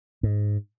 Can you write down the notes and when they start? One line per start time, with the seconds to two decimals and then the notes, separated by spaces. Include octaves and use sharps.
0.23 G#2